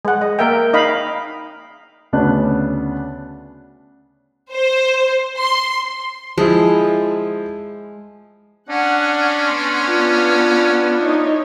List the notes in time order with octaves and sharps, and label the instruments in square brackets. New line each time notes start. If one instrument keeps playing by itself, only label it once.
[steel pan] G#3 F#5
D#5
A#3 A#4 E5 G5
D#4 D#5 F5 B5
[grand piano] D2 C#3 B3 C#4 D4 F#6
[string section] C5
C6
[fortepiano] F3 E4 [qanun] G#3
[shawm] C#4 [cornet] D4 [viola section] F#5
[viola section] B3 [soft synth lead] C6
[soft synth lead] F4
[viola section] D#4 E4 C#5